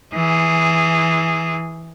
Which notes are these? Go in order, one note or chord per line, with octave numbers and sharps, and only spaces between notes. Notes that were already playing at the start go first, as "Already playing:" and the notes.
E3 G#4